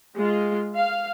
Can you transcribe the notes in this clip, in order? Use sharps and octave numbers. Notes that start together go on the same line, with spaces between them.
G#3 F4
F5